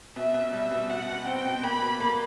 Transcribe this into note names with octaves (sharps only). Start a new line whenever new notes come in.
B2 E5
B2
G3 E5
B2
B2 F#5
B2
C4 G5
B2
A#3 B5
B2
A#3